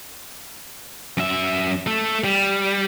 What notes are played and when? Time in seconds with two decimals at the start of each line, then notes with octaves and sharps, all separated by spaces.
1.17 F#2 E5
1.87 A3 A4
2.24 G3